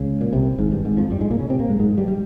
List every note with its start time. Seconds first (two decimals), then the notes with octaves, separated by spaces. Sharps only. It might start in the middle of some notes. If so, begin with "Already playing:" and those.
Already playing: C#2 C#3
0.21 A#2
0.33 C2 C3
0.58 G#1 G#2
0.72 G2
0.85 G#1 G#2
0.97 F2 F3
1.10 G2 G3
1.21 G#2 G#3
1.31 A#2 A#3
1.40 C#3 C#4
1.49 C3 C4
1.59 A#2 A#3
1.69 G#2 G#3
1.79 G#2 G#3
1.98 G2 G3
2.08 G3